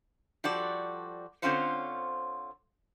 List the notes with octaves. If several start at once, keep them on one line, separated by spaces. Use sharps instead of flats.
F3 G3 F#4 A4 D5
D3 C4 C#4 F4 C5 C#5